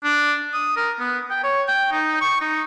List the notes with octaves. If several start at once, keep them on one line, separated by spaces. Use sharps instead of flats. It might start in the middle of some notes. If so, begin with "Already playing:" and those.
D4
D#6
A#4
B3
G5
C#5
G5
D#4
C#6
D#4